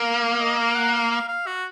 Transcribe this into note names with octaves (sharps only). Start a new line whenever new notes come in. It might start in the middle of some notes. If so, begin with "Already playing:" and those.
Already playing: A#3 F5
D#5
F5
F#5
F5
F5
F5
F#4